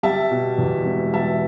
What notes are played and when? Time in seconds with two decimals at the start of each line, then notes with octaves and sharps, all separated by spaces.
0.03 G3 E5 A5
0.31 B2
0.58 E2
0.85 E1
1.13 G3 E5 A5